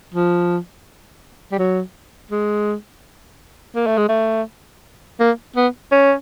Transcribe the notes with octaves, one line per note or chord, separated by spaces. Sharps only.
F3
G3
F#3
G#3
A#3
A3
G#3
A3
A#3
B3
C#4